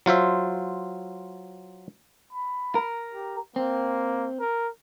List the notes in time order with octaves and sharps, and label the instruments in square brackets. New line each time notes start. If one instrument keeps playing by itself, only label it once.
[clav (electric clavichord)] F#3 F4 C5 E5
[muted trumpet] B5
[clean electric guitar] A#4
[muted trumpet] G4
[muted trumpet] A#3 [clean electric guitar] C4
[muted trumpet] A#4